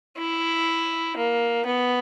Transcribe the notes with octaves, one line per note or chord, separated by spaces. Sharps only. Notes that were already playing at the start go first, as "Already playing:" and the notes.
E4
A#3
B3